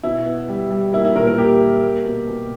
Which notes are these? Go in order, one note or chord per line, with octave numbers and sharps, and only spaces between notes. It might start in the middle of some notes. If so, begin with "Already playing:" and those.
B2 E4
B3
G3
G3
A#3 E4
E4
A#2 A#4
A#4
A#3 G4
A#3
A#3
B2
B2